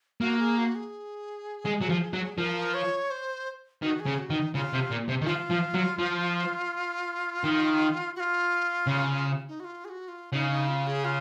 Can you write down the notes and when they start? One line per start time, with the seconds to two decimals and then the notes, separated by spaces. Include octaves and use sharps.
0.21 A#3 F#4
0.39 G#4
0.57 F#4
0.75 G#4
1.66 G#3
1.82 F#3
1.90 F3
2.14 F#3
2.38 F3 A#4
2.74 C#5
3.10 C5
3.82 D#3 F#4
4.00 G#4
4.06 C#3
4.19 F#4
4.30 D#3
4.37 D#4
4.54 C#3 F4
4.73 C3
4.91 A#2
5.08 C3
5.22 D#3
5.26 F3 F4
5.51 F3
5.75 F#3
5.99 F3
7.44 D#3
8.16 F#4
8.20 F4
8.87 C#3
9.48 D#4
9.60 F#4
9.64 F4
9.85 G#4
9.89 F#4
10.08 F4
10.32 C#3 D#4
10.51 D#4
10.68 F4
10.87 G#4
11.05 F4